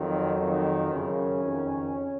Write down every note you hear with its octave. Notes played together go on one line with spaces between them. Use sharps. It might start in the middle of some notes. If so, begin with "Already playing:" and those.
Already playing: F2 D#3 F#3
F2 D#3
F#2 C#3 C#4
F2 D#3